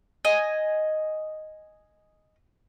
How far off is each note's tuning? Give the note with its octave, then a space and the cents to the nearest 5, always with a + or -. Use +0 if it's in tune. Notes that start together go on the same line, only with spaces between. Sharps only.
D#5 +0 G#5 +0